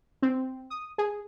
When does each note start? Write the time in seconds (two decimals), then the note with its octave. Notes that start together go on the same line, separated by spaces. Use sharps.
0.22 C4
0.70 D#6
0.98 G#4